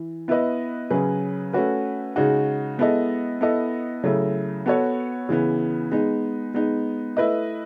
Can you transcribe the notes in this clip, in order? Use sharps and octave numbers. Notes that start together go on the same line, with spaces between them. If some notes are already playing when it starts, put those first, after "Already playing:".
Already playing: E3
B3 E4 B4 D#5
C#3 F#3 C#4 G#4 B4
A3 C#4 F#4 B4
C#3 G#3 D#4 F#4
G#3 B3 E4 A4 D#5
B3 E4 A4 D#5
C#3 F#3 A3 E4
B3 F#4 A4 C#5
C#3 E3 B3
G#3 B3 D#4
G#3 B3 D#4
A3 E4 B4 D#5